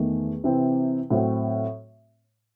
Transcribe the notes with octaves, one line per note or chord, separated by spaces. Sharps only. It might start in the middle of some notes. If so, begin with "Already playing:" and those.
Already playing: E2 D#3 A3
C3 E3 C4 E4
A2 F#3 C4 F#4